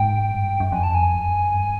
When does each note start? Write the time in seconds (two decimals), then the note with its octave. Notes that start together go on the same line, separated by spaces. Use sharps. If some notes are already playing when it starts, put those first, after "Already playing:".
Already playing: G#2 G5
0.32 G2
0.60 F#2
0.72 F2 G#5
0.84 A5
0.95 G#5
1.13 F#2
1.54 G2